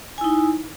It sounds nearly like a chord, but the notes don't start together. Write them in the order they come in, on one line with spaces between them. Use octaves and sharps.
G#5 E4 D#4